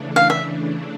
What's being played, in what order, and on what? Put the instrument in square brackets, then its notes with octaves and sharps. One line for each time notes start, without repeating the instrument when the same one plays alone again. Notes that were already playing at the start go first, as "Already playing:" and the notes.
Already playing: [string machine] C#3 E3 A3 D4
[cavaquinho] F5
E5